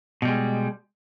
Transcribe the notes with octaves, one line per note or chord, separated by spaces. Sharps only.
B2 G3 G#3